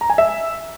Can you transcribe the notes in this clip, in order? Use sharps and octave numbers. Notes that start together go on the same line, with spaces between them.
A#5
G#5
E5